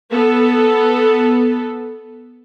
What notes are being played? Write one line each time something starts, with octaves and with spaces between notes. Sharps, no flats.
B3 A4